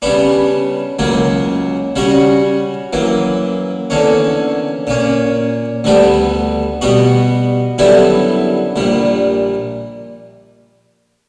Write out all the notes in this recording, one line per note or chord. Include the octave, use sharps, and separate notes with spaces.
C#3 G3 B3 D4
C#2 C#3 F#3 A#3
C#3 G3 C#4 F#4
F#2 E3 A#3
E2 D3 A#3 C#4
A#2 A#3 C#4
D2 D3 G3 B3 D4
B2 G3 B3 F#4
F#2 D3 G3 B3 E4
A#1 A#2 G3